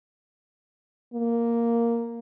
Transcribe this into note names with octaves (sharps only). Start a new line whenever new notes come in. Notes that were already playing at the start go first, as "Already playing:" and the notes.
A#3